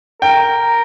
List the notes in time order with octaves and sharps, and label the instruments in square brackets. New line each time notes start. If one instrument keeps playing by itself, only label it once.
[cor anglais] A#4 [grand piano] G5